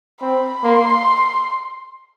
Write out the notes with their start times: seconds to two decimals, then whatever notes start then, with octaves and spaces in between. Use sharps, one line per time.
0.21 C4 B5
0.64 A#3 C6